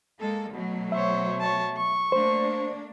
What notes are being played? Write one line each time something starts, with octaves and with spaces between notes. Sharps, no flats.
G#3 A#3 A4
B2 F#3 A3
C5 C#5 E5
C#5 A5
C#6
A3 A#3 D4 C5